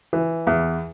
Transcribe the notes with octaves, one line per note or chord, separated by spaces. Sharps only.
E3
E2